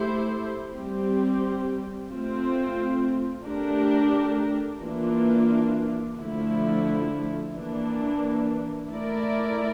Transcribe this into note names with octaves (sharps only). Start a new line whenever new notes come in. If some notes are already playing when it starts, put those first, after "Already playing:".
Already playing: A3 E4 G4 C5
G3 C4 G4
A3 C4 F4
A3 D4 G4 A#4
E3 A#3 D4 F4
D3 F3 A3 E4
E3 A#3 D4
A3 E4 A#4 D5